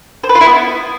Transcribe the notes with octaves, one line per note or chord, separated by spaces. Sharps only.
C5
B4
F4
E4
B3